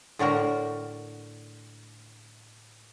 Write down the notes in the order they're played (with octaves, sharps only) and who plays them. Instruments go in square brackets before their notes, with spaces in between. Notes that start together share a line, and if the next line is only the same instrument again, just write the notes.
[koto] A2 D3 F#4 A#4